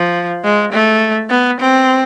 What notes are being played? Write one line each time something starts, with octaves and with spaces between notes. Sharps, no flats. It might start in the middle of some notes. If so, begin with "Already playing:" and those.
Already playing: F3
G#3
A3
B3
C4